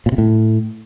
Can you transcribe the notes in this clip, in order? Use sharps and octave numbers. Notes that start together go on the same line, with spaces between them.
A#2
C3
A2